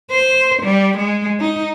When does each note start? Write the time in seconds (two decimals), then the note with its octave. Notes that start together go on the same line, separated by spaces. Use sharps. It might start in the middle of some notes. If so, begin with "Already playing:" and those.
0.11 C5
0.62 G3
0.97 G#3
1.40 D#4